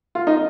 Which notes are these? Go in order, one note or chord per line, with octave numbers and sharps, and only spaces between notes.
F4
D#4